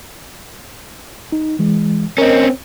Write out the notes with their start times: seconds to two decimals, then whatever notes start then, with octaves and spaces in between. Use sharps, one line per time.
1.32 D#4
1.59 E3 G#3
2.18 C4 C#4 A#4 D#5